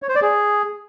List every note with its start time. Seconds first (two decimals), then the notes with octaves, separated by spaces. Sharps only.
0.02 C#5
0.09 C5
0.15 D5
0.22 G#4